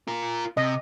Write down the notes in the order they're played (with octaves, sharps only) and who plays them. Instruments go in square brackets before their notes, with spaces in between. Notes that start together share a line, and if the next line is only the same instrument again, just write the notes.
[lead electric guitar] F4 A#4
[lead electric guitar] C3 [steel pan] D#5